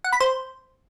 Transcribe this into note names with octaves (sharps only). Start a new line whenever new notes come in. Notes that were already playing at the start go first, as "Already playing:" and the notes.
F#5
B5
C5